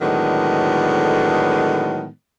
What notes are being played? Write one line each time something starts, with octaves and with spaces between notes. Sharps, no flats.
A2 D3 D#3 F#3 G#3 B3